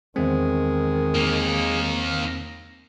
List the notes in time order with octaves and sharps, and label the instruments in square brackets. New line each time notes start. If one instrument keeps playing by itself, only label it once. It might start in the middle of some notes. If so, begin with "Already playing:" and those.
[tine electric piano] E2 C4 [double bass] D#3 [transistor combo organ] G#3
[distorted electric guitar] A#3 D#4